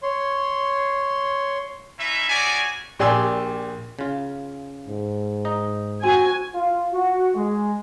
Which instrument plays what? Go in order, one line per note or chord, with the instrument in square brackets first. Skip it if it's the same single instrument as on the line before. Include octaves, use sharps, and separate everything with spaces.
[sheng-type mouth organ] C#5 C6
[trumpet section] C#4 D#4 E4 E5
G3 C#4 F#4 G#4 D5 G#5
[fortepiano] A#1 G4 D5 G#5 C6 E6
[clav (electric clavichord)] C#3 F4
[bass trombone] G#2
[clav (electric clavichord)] D#4 D#5
[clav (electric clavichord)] C4 [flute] F#4 [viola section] G#5
[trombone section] F4
F#4
G#3